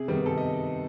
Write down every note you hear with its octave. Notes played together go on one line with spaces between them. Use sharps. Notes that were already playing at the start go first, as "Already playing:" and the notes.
Already playing: C3 G#4
D#3 G3 B3 D#4
C3 A4
D#5